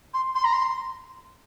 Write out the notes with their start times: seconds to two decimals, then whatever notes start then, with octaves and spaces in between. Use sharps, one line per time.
0.14 C6
0.35 C6
0.44 A#5
0.53 C6